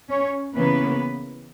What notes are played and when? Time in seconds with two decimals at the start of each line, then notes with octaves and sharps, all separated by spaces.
0.10 C#4 C#5
0.55 C#3 E3 A#3 B3 C#4 B4